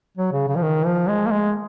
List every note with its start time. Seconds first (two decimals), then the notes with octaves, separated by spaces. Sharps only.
0.17 F#3
0.33 C#3
0.48 C#3
0.56 F3
0.62 D#3
0.86 F3
1.09 G#3
1.26 A#3
1.32 G#3